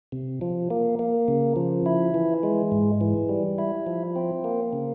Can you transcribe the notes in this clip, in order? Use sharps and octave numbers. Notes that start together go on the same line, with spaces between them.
C3
F3
A#3
A#3
C#3
F3
E4
E3
G#3
G#2
E3
G3
E4
F3
C4
A#3
C#3